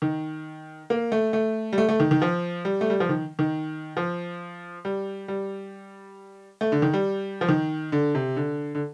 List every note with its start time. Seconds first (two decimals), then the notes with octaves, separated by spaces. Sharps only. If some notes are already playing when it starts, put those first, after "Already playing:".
0.02 D#3
0.90 A#3
1.12 A3
1.33 A3
1.73 G3
1.78 A3
1.89 A3
2.00 D#3
2.11 D#3
2.22 F3
2.65 G3
2.81 A3
2.90 G3
3.00 F3
3.09 D#3
3.39 D#3
3.97 F3
4.85 G3
5.28 G3
6.61 A3
6.72 D3
6.82 D#3
6.93 G3
7.41 F3
7.49 D#3
7.92 D3
8.15 C3
8.36 D3
8.75 D3